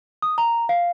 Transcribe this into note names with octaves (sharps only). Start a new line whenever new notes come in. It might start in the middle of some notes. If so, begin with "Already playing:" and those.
D#6
A#5
F5